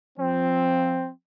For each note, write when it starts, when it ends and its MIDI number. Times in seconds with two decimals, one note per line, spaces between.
0.18 1.10 53
0.18 1.10 60